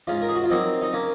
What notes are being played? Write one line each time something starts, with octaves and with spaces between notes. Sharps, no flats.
G#2 C#4 F4
A#4
G#4
F#4
F4
F#3 A#3 C4 D#4
D#4
A#3 C#4